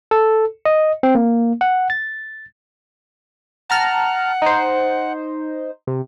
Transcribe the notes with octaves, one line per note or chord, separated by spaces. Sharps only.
A4
D#5
C4
A#3
F#5
A6
F#5 A5 A#5 F6
D#4 C5
C3